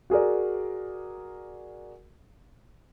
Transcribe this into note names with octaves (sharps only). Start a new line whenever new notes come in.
F#4 G#4 A#4 D5